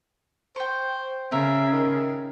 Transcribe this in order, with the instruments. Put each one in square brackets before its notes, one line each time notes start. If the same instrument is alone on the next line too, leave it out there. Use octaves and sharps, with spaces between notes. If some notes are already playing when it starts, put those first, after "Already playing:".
[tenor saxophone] C5 [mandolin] G5 C#6
[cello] C#3 [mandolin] A#4 [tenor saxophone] E5
[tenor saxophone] D#3